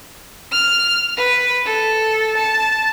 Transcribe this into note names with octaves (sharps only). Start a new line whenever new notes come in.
F6
B4
A4
A5